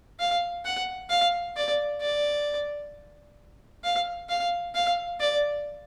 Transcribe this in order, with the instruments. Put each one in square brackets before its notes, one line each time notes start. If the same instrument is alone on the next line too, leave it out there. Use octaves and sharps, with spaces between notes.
[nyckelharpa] F5
F#5
F5
D5
D5
F5
F5
F5
D5